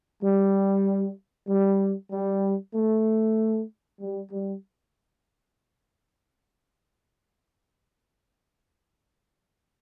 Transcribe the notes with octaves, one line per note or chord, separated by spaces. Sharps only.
G3
G3
G3
A3
G3
G3